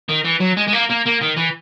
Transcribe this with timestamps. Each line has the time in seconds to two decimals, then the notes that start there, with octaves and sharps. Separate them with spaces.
0.09 D#3
0.25 E3
0.40 F#3
0.57 G#3
0.67 G#3
0.73 A#3
0.90 A#3
1.06 A#3
1.21 D#3
1.37 E3